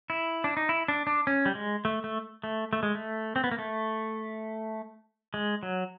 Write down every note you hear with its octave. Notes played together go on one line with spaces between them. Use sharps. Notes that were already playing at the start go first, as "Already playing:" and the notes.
E4
D4
D#4
E4
D4
D4
C#4
G3
G#3
A3
A3
A3
A3
G#3
A3
C4
B3
A#3
A3
G#3
F#3